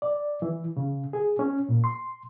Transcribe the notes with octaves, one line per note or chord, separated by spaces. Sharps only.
D5
E3
C#3
G#4
C#4
A#2
C6